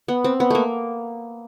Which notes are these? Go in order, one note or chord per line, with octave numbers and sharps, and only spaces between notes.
B3
C4
B3
A3 A#3